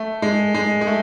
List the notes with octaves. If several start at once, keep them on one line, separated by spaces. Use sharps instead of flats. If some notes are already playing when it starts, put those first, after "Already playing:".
Already playing: A3
G#3
G#3
G#3
A3